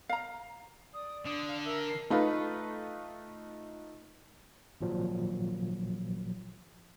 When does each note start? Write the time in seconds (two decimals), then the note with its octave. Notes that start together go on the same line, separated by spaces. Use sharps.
0.09 F5 A#5
0.94 D5 D#6
1.25 D3 D#6
1.48 F5
1.65 A#4 E5
1.88 C7
2.10 A3 D#4 F4 B4
4.81 G#1 A#2 F3 F#3